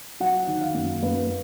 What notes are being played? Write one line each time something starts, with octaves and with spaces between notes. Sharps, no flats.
F#3 F#5
D#3
F5
F#2
F#2 B4